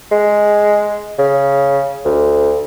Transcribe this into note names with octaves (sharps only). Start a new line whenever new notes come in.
G#3
C#3
D2